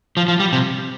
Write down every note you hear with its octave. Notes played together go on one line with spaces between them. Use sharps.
F3
F3
G3
C3